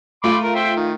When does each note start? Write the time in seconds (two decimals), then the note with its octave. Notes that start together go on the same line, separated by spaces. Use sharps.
0.24 A3 F4 B5 C6 D6
0.43 A#4
0.55 C5 E5 G5
0.76 D#3